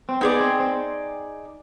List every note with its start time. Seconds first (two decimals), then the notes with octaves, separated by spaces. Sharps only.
0.09 C4
0.21 B3 D#4 G#4 D5
0.40 C4
0.60 C4